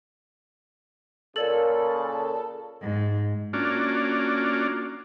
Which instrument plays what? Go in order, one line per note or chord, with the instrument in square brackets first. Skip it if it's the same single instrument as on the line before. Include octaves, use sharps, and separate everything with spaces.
[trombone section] A#2 C#3 [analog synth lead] A4 [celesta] A#4 D5 F#7
[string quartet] G#2
[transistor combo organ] A#3 C#4 D4 F4 F#4 D5